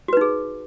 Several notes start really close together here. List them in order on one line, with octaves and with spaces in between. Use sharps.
F#4 B4 D#4 G#4